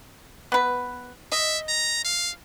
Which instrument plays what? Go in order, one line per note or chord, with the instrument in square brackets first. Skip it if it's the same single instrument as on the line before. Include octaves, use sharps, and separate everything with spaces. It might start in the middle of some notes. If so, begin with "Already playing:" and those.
[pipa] B3 B4
[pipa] D#5 [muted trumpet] E5
[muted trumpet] A#5
F5